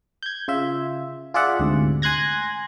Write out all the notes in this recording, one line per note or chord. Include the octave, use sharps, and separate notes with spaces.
G6 G#6
C#3 F4 E5
F4 G#4 D5 E5 F#5
D2 G#2 C3
G#5 C6 F#6 G#6 A#6